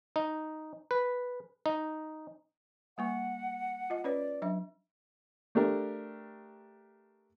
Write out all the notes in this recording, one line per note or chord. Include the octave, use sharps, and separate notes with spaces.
D#4
B4
D#4
G3 A#3 F#5 C#6
F4 D#5
C#4 B4 C#5 D5
F#3 D4 E5
A3 D4 G4 A#4